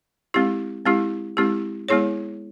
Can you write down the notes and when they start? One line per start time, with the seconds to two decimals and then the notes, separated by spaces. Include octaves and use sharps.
0.34 G#3 C4 E4 G4
0.85 G#3 C4 E4 G4
1.37 G#3 C4 E4 G4
1.88 G#3 B3 E4 G#4 C#5